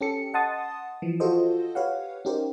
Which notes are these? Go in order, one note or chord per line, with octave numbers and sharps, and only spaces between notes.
C#4 G4 A4 C#7
D#5 F#5 A5 C6 D#6 A6
E3 F3
F4 F#4 A4 C5 D#5
G4 B4 C#5 F5 F#5
C#4 D#4 G4 A#4 C5